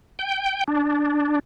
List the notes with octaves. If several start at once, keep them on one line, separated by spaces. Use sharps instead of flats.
G5
D4